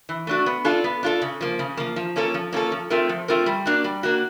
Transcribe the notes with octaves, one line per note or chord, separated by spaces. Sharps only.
E3
A3 D4 F#4
B3
D4 F4 A4
B3
D4 F4 A4
C#3
F3 A#3
C#3
F3 A#3
F3
A#3 C#4 F4 A4
F3
A#3 C#4 F4 A4
F3
A3 C4 F4 A#4
F3
A3 C4 F4 A#4
G3
A#3 D4 F#4
G3
A#3 D4 F#4